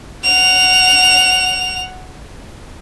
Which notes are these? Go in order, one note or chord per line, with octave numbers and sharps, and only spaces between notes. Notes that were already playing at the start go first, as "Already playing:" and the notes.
F#5 F7